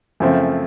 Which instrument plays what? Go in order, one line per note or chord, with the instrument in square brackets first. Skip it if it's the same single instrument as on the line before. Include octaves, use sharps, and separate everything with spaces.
[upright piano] F#2 C#3 F3 A3 C4